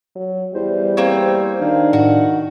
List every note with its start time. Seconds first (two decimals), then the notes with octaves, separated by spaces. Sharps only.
0.16 F#3
0.54 E2 G3 C5
0.97 A#3 C4 C5 C#5
1.61 D#3 D4 F5
1.93 A2 F#4